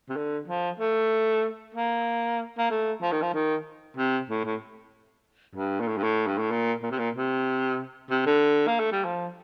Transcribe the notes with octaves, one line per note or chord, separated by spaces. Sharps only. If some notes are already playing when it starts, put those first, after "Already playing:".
C3
D3
F3
A3
A#3
A#3
A3
F3
D#3
F3
D#3
C3
A2
A2
G2
A#2
A2
G2
A2
G2
A2
A#2
A#2
C3
A#2
C3
C3
D3
A#3
A3
G3
F3